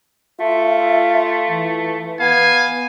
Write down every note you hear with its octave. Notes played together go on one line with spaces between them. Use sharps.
A3 F4 E5
E3
B3 F5 G#5